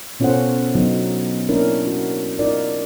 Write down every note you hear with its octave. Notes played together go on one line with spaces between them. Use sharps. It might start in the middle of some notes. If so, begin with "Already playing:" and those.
B2 C#4 F4 A4 C5 F#5
D3 F#3 B3 D#4
A#3 C#4 D4 E4 A#4
F#4
D#4 F4 A#4 D5